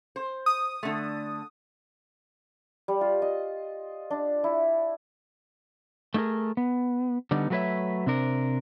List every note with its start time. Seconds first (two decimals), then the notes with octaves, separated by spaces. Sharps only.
0.16 C5
0.46 D#6
0.83 D3 A3
2.88 G3
3.01 F4
3.22 D#5
4.10 D4
4.44 E4
6.14 A3 D#4 E4 G#4 A#4
6.57 B3
7.31 D3 G3 B3 D#4
7.50 F#3 A3 F#4 B4 C#5 E5
8.06 C3 C4 D4 A#4